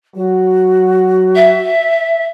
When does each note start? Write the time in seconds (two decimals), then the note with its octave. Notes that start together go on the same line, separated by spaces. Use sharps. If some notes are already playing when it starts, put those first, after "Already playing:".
0.16 F#3 F#4
1.35 E5